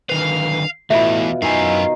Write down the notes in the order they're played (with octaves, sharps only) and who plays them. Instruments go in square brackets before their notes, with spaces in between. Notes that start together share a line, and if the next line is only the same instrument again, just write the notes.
[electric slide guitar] D3 D#3 B4 [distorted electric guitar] F5
[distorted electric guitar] E2 [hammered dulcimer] B2 F4 [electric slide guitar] A3 E4 [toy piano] E5 B5
[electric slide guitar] F#2 G#5 [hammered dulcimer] D#3 [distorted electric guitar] E4 F5